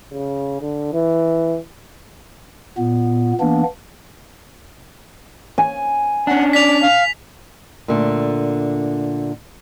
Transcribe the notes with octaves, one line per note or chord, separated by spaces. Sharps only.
C#3
D3
E3
A#2 B3
E3 A#3 B3 D4
G#5
C#4 D4 F#5
D5 B6 F7
F5
A#2 D3 A3